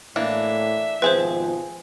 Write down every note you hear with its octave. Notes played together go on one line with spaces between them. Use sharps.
A2 E3 A#3 D4 E5
G#1 B2 F3 C4 G#4 B4 C5